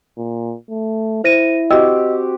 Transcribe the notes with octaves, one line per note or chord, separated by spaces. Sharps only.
A#2
A3
E4 C5 A#6 D#7
C4 F#4 G4 D#5 G5 E6